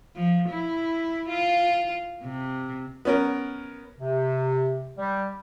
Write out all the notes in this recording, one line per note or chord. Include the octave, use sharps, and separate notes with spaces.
F3
E4
F4
C3
B3 C#4 A#4
C3
G3